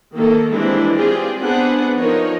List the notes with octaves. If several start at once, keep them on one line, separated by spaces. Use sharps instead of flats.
D#3 A#3 A4
E3 G3 G#3 C4 D4 E4
C4 F4 G4 G#4 D5
B3 C4 D4 G#4 B4 F#5
F3 D#4 A#4 C#5